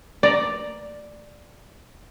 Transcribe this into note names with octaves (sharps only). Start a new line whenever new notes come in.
D5 A#5